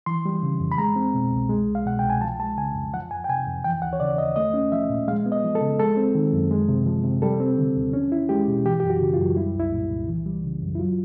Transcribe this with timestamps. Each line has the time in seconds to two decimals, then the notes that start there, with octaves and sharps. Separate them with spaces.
0.06 E3 C6
0.25 G3
0.43 C#3
0.60 F2
0.72 B5
0.78 G#3 A#5
0.96 C4
1.14 B2
1.32 C2
1.49 G#3
1.68 C2
1.75 F5
1.85 B2 F#5
1.99 C2 G5
2.10 G#5
2.21 F3 A5
2.39 G#3 A5
2.57 C#3 G#5
2.75 F2
2.94 F3 F#5
3.11 F2 G#5
3.24 G5
3.29 C3 G#5
3.47 F2
3.64 E3 G5
3.82 D#2 F#5
3.93 C#5
4.00 C#3 D5
4.18 D#2 D#5
4.36 A3 D#5
4.54 C#4
4.72 F3 E5
4.90 A#2
5.08 G#3 F5
5.26 B3
5.32 D#5
5.44 F3
5.55 A4
5.62 C#3
5.80 G#3 A4
5.97 C4
6.15 D#3
6.33 F#2
6.51 G#3
6.69 C3
6.86 F3
7.04 C3
7.22 G3 A4
7.40 C4
7.58 D3
7.77 D#2
7.93 C#4
8.12 E4
8.29 G#3 G4
8.48 B2
8.65 E3 G4
8.80 F#2 G4
8.90 F#4
9.01 C#3
9.14 F4
9.19 F#2
9.37 G3 E4
9.55 C2 E4
9.72 A#2
9.91 C2
10.08 E3
10.26 G3
10.44 C#3
10.62 F#2
10.75 E4
10.80 F#3 F4